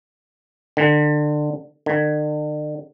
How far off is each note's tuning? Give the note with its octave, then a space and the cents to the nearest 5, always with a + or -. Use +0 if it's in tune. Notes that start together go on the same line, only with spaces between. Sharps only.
D3 +25
D3 +45